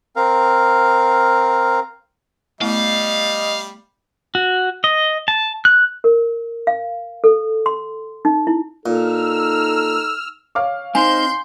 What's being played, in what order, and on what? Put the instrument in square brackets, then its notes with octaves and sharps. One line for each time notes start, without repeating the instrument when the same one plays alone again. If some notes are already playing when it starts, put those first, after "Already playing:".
[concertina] C4 A#4 F5
[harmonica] G3 [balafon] A3 B3 E4 [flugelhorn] D#5 [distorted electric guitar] F5
[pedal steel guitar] F#4
D#5
A5
F#6
[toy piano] A#4
F5
A4
C6
D#4
E4
[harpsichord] A#2 [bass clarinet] D#4 [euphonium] A4 [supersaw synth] E6 F6
[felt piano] C#5 F5 D6
[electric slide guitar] C4 D#4 C5 [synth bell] G#5 [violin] C6 G6